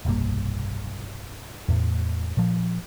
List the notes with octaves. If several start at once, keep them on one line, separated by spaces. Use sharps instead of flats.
F1 B1 G2 A#3
E2 A2
A#2 F3